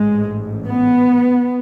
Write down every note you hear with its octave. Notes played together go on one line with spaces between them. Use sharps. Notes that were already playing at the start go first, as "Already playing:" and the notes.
Already playing: A1 G#2 G#3
B3